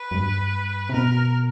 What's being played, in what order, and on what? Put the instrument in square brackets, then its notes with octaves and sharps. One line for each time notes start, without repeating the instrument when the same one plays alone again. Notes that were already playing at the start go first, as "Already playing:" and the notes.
Already playing: [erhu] B4
[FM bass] F#2
G2
C3
[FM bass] B2 [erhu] A#4